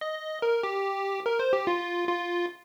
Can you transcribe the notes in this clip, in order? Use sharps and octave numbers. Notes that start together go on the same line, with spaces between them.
D#5
A#4
G4
A#4
C5
G4
F4
F4